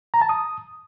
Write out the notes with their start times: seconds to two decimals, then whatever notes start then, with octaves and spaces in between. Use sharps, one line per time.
0.14 A#5
0.21 A5
0.29 D#6